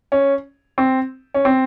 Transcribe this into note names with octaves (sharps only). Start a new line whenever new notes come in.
C#4
C4
C#4
C4